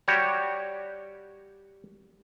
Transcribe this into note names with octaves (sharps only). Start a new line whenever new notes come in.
G3 F#4 G4 C#5